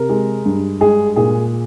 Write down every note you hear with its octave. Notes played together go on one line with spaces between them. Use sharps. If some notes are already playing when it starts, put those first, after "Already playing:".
Already playing: C3 A#4
G#3
G2
G#3 G#4
A#2 G#4